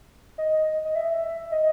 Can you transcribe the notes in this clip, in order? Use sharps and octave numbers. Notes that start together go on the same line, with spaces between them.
D#5
D#5
E5
D#5